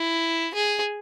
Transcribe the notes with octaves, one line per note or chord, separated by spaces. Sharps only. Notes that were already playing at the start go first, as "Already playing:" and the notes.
Already playing: E4
G#4